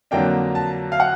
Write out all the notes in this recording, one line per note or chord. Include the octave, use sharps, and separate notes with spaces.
F2 D3 F#3 A#3 D4 G5
A5
F5
F#5